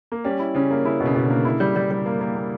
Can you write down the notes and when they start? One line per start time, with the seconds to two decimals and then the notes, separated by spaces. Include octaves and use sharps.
0.12 A#3
0.24 G3 C#4
0.39 E4
0.55 C#3 C#4
0.71 A#3
0.85 C#3 E4
1.00 B2
1.05 C#3
1.16 B2
1.25 D3 A#3
1.45 E4
1.60 G3
1.76 G3
1.91 G3
2.06 A#3
2.21 A#3
2.36 A#3